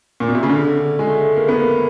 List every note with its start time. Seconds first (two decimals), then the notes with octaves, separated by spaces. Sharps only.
0.20 A#2
0.28 B2
0.35 C3
0.43 C#3
0.49 D3
0.99 G#3
1.07 A3
1.36 A#3
1.48 B3
1.60 A#3